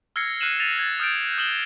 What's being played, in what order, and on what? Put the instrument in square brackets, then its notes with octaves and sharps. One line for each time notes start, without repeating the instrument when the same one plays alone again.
[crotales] E6 F6 G#6 A#6 C7 C#7
F6 F#6 C7 D#7 E7 F#7
A6 A#6 D#7 F7
G#6 A6
D#6 F6 G6 A6 D7
D#6 F6 E7 F#7 G7